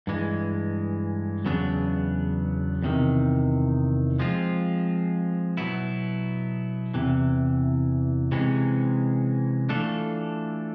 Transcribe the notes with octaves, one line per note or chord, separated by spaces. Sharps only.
G2 E3 G#3
E2 C#3 F#3 B3 D4
E2 C3 D#3
F3 G#3 C4 F4
B2 F#3 B3 E4
E2 C3 E3
C3 E3 G#3 C#4
E3 A3 D4 F4 A4